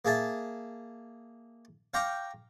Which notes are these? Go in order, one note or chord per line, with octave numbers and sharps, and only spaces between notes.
A#3 G#4 E5 A5
F5 G5 A#5 C#6 D6